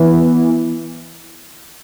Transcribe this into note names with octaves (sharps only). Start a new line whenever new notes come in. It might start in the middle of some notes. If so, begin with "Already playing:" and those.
Already playing: E3 B3 E4